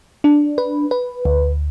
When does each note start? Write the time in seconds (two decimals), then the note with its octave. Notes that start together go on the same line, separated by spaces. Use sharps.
0.24 D4
0.58 B4
0.91 B4
1.25 D2